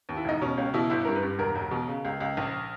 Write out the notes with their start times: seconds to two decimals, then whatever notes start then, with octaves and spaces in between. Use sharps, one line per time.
0.09 D#2
0.17 E4
0.25 E1 D#4
0.41 B2 C#4
0.57 C#2 C#4
0.74 B2 E4
0.90 G1 E4
1.05 G2 A#4
1.15 B4
1.23 G2
1.39 E1 A#4
1.55 E1
1.71 B2
1.88 C#3
2.05 C#2
2.20 C#2
2.37 A#1